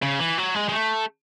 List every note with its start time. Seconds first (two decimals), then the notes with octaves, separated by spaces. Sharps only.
0.02 C#3
0.19 E3
0.38 F#3
0.54 G#3
0.69 G#3
0.72 A3